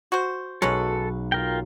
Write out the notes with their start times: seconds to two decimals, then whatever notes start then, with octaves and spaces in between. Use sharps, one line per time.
0.12 F#4 C5
0.62 B1 F#3 G#3 C#4 A4 B4
1.32 F4 A#4 G5